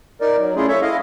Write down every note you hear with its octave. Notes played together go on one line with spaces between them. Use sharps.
D#4 A#4 D5
F#3
A3 C#4 E4 F4 G#4
A4 C#5 E5
E4 D#5 F5